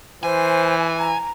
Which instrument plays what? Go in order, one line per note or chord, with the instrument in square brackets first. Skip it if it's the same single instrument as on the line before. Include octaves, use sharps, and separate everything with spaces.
[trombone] E3 [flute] C5 [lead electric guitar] G#5
[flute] A#5